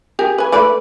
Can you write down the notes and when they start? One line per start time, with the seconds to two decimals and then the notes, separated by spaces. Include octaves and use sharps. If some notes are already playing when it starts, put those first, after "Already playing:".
0.19 G4 G#4 A#4
0.38 B4 G#5
0.52 A3 B4 D5